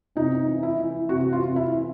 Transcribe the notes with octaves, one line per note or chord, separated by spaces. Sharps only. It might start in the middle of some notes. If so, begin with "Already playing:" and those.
C3 D#4
E3
E4
E3
C3 F#4
F4
C3
E4
E3